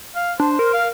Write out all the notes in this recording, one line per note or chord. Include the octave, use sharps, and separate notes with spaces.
F5
D4 C5
A#4
F5